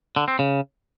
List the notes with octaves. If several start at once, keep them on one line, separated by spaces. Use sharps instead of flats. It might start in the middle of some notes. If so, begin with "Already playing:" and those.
D3
C4
C#3